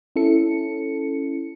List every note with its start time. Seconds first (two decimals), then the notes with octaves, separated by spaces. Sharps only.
0.16 C#4 E4 A4 C#7